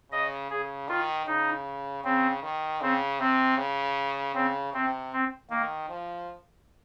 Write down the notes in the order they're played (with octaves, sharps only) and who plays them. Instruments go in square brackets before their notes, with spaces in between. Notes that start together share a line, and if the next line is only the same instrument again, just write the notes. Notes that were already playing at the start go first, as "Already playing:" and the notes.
[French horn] C#3 [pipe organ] D#5
[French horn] C#3 [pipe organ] G#4
[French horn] D#3 [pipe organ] F4
[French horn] C#3 [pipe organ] D#4
[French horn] C#3 [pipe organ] C4
[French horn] D#3
[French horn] C#3 [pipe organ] C4
[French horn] C3 [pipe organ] C4
[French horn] C#3
[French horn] C#3 [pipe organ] C4
[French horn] C3 [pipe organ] C4
[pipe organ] C4
[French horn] D#3 [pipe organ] A#3
[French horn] F3